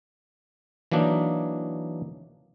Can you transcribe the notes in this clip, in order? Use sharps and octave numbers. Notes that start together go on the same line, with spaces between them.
E3 F#3 A#3 D4 D#4